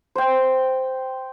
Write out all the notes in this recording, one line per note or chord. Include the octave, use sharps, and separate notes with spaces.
C5 G5